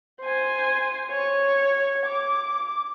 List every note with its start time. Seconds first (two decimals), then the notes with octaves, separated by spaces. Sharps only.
0.21 C5 G#5
1.11 C#5
2.06 D6